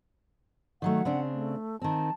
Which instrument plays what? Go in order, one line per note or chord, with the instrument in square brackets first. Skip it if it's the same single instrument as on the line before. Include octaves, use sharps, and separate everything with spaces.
[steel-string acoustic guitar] D#3 F#3 A3 [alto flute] F#5
[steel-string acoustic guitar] C#3 C4 D4
[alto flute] A3
[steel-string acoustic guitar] D#3 C4 [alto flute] A5